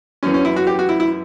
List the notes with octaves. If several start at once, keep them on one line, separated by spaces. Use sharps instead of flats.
F#2 E3 C#4
C#4
E4
F#4
G4
F#4
E4
E4